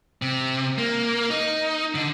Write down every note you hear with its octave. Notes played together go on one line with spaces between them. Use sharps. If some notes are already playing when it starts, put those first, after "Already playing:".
C3
A#3
D#4
D3